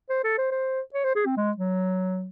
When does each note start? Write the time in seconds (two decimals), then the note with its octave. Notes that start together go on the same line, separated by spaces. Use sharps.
0.10 C5
0.24 A4
0.38 C5
0.52 C5
0.94 C#5
1.04 C5
1.15 G#4
1.26 C4
1.37 G#3
1.57 F#3